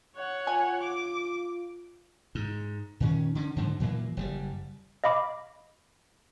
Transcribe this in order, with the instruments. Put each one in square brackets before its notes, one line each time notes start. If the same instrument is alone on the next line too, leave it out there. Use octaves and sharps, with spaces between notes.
[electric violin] C#5 F#5
[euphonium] F4 [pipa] G#5
[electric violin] D6
[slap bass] G#2
A#2 D#3 C#4
D3 C#4
G#2 D3 D#3 F#3
A#2 E3 F#3 A#3
F#1 C#3 G3
[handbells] D#5 F5 B5 D6